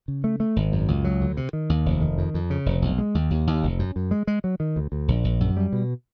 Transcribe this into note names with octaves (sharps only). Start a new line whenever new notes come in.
C#3
A3
A3
G#1
F#2
C#2
F#3
D2
C3
D#3
D#2
F1
D#3
F2
F2
C#3
F1
B1
G#3
D#2
D#2
D#2
F1
F#2
F#2
G#3
G#3
F#3
D#3
D2
D2
A#1
A#1
F#2
G3
B2